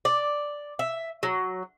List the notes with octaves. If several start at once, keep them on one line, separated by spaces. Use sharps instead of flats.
D5
E5
F#3